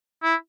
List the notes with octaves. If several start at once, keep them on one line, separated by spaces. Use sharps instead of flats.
E4